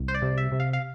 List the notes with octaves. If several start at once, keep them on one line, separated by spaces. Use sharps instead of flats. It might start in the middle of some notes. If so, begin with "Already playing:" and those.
Already playing: C2
C5
D5
C3
E5
C3
F5
F5